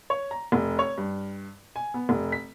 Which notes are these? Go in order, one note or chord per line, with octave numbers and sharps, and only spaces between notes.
C#5
A#5
F1
C#5
G2
G#5
B3
F1
B6